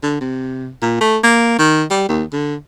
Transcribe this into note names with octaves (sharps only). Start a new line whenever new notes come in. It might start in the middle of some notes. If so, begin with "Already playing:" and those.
D3
C3
A#2
A3
A#3
D#3
G3
D#2
D3